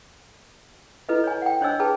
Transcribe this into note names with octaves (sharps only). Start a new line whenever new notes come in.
E4 A4 B4 D#5
C#5 G#5
F#5 G5
D4 C5 C#5 D#5 G#5 E6
G#4 B4 G5 A5